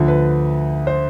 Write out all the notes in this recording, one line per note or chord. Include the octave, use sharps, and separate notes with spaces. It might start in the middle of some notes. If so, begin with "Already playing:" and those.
Already playing: D2 D3 F3
B4
C5